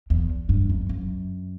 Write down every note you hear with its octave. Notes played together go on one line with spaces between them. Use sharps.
E2
G2
F#2
F#2